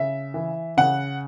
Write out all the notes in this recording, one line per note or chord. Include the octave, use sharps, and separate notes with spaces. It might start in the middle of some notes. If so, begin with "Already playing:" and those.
Already playing: C#3 E5
E3
C#3 F#5